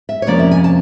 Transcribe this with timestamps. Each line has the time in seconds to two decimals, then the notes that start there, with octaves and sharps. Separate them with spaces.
0.09 E5
0.22 C#5
0.27 F2 C3 F3 A#3 C#4 D5
0.39 E5
0.51 G#5
0.64 A5